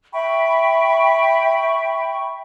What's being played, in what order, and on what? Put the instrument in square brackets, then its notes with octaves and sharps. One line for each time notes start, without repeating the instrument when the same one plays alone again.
[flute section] E5 G5 B5 C#6